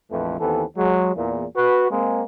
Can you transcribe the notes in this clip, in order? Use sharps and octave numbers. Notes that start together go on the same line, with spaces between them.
A#1 F2 E3 F3 A3 B4
D#2 E3 B3 C4 A4
F#3 G#3
E2 A#2
F#4 B4
G#3 A#3 C4